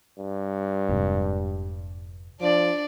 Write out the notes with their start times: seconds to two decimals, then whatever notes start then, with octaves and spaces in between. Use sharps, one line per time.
0.19 G2
0.89 F1 G#2 C3
2.41 F3 D4 D5